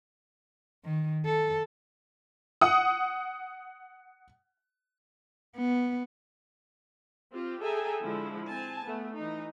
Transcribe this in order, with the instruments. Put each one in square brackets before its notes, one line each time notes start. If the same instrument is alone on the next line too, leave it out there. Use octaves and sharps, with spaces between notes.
[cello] D#3
A4
[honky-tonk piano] F#5 D#6
[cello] B3
[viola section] C4 F4 G4
G#4 A4 E5 G5 G#5 A#5
D3 F3 G#3 E4
C4 G#5 A5
A3 B3
E3 D#4